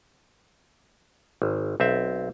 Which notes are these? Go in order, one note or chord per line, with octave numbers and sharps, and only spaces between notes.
G#1
B1 C4 E5